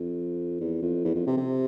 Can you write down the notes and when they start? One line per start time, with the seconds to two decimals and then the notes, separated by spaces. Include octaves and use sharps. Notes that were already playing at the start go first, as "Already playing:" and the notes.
Already playing: F2
0.60 E2
0.82 F2
1.05 E2
1.15 F2
1.27 C3
1.37 C3